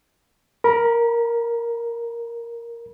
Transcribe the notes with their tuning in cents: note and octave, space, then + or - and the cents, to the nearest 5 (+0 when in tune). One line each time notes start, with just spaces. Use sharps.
A#4 +0 B5 -35